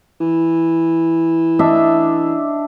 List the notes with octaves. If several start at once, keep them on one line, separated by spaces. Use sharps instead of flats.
E3
D4 D#5 E5